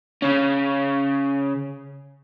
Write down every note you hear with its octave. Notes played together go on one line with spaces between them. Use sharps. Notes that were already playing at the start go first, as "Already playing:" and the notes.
C#3 C#4